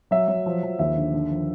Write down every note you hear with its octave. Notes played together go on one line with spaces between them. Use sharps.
F#3 E5
F#3
F3
F3
D#2 E5
D3
D3
F3